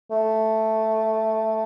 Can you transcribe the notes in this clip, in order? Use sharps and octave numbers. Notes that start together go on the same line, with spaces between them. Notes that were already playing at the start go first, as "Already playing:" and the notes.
A3